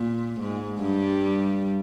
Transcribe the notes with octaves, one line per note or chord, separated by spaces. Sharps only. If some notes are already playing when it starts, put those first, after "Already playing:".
Already playing: A#2
G#2
G2 G3